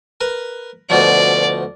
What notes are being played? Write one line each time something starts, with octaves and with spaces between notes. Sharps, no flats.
A#4 B4
D2 B2 F3 D5